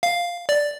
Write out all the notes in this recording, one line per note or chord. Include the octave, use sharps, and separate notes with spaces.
F5
D5